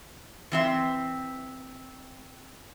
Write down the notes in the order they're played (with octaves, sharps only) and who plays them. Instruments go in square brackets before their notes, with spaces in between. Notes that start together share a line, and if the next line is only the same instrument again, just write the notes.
[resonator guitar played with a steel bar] E3 C4 E5